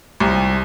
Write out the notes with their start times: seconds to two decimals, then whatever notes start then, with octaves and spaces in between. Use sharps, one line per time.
0.20 C2